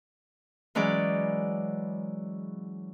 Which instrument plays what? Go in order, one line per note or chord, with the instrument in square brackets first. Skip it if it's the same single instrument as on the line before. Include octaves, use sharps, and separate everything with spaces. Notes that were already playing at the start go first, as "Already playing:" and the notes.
[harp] E3 F#3 G#3 C#4 D5